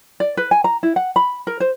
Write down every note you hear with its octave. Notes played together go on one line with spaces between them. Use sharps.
D5
B4
G#5
A#5
E4
F#5
B5
A#4
C5